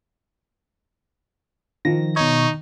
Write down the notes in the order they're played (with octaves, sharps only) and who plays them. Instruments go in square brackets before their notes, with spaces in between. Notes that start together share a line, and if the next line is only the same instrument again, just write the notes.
[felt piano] D#3 [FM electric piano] F3 A#6
[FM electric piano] B2 C#5 [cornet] D#4